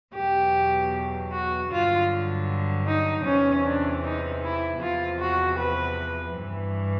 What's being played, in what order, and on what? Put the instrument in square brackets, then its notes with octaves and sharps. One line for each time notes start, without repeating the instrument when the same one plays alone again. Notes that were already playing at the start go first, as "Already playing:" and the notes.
[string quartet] E2 B2 F#3 G4
F#4
G2 D3 F#3 F4
D#4
E2 C3 E3 C#4
D4
D#4
E4
E2 C3 F3 F4
F#4
B4
G2 E3